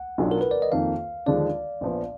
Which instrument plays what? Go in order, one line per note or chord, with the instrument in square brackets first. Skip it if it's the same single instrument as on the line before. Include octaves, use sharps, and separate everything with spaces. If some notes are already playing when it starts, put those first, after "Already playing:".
Already playing: [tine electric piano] F#5
[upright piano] B1 B2 F#3 D4 F4
[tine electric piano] A#4
B4
D5
D#5
[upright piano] F2 D#3 A#3 [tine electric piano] F5
[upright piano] D#2 D3 F3 G#3 D4 [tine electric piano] D5
[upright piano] A#1 A#2 F3 B3